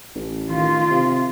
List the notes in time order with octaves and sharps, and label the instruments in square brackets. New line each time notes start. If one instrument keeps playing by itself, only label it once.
[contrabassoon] A1
[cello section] D#3 F4
[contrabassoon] C3